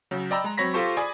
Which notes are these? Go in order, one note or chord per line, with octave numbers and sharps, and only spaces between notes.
C#3 F#3
D5 D#5 G5 A#5 B5 E6
G#3 A#5
F#3 C4 C#5 B5 A#6 B6
F4 G4 A4 C5 C#6
G#4 D5 G#5 B5 D6 D#6